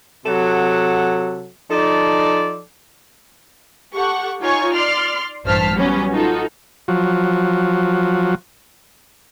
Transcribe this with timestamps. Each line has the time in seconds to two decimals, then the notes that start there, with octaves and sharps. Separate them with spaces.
0.26 C3 F#3 A4 F#5
1.70 F3 D#4 A4 D5
3.94 G4 A4 F#5 C#6
4.41 D#4 F4 C#5 G#5 C#6
4.74 D5 C6 F6
5.45 A1 G2 C5 A5 F6 B6
5.75 F#3 G3 B3 C#4
6.13 D#4 F4 F#4 A4
6.88 F3 F#3